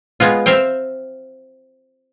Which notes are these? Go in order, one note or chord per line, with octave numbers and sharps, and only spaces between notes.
G#3 B3 F4
C4 E5 F5 G5